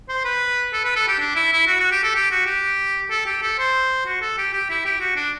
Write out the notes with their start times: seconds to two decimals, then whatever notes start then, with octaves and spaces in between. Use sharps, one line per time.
0.09 C5
0.25 B4
0.73 A4
0.84 B4
0.96 A4
1.08 G4
1.20 D4
1.36 E4
1.52 E4
1.67 F#4
1.80 F#4
1.91 G4
2.03 A4
2.15 G4
2.31 F#4
2.46 G4
3.10 A4
3.26 G4
3.42 A4
3.59 C5
4.06 F#4
4.21 A4
4.38 G4
4.53 G4
4.70 E4
4.85 G4
5.00 F#4
5.16 D4